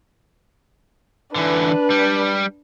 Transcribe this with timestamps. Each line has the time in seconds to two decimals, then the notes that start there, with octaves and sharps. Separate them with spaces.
1.35 D3 E3 D4 B4
1.90 G3